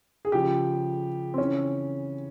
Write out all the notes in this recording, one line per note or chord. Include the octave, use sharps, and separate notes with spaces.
G#4
C#3 F3 G4
C4
C#3 E3 C#4